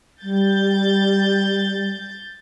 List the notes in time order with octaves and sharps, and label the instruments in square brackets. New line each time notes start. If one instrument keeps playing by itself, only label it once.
[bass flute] G3 [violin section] G6 A6